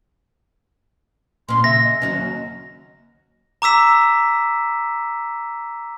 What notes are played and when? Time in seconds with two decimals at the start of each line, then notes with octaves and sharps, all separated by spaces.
1.49 A#2 C#4 C6
1.64 C#3 E5 A#6
1.84 D#5
2.02 D#2 F#3 C#4
3.62 A#5 D6 E6 B6 E7